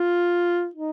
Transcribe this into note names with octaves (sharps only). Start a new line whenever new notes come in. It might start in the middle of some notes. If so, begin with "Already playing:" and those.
Already playing: F4
D#4